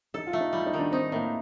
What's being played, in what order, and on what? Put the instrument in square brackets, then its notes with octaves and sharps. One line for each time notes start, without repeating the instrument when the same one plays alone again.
[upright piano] D#4 [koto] A4
[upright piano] F4
[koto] A3
[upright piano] D#4
[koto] G3 [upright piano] F4
[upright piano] D#4
[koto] D#3
[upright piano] D4
[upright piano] C4 [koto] D#4
[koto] A2 [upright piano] A#3